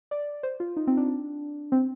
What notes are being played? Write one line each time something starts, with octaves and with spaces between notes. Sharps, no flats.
D5
C5
F4
D#4
C4
D4
C4